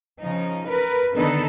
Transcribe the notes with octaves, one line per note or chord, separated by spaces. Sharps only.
C#3 F3 D#4
A#4 B4
D3 D#3 B3 D#4 A4 B4